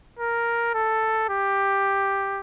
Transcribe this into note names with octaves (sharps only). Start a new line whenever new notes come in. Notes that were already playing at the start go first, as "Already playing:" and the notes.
A#4
A4
G4